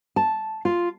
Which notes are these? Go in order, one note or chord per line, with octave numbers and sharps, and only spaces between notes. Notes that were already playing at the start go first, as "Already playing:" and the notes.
A5
F4